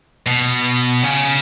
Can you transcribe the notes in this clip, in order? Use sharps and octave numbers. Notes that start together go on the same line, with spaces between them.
B2
C#3